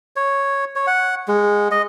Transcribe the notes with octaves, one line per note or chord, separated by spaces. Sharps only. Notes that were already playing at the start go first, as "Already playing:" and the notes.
C#5
C#5
F#5
G#3
D#5